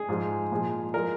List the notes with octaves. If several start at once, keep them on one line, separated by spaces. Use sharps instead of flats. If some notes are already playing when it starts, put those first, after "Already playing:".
Already playing: G#4
G#2 F3 G#3
A#2 F3 G#3
F3 G#3 A#4